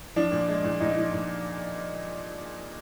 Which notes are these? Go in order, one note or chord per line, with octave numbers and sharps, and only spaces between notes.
F3 D4
A#2
G#3
A#2
A#2 D#4
F3
A#2